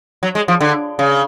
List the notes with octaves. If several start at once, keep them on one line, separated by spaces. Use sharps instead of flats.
F#3
G#3
F3
D3
C#3